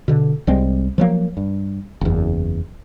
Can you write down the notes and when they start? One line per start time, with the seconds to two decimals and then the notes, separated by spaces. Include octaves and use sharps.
0.08 B2 D3
0.47 C2 G3 G#3 C4
0.98 F3 F#3 A#3
1.37 G2
2.01 F#1 E2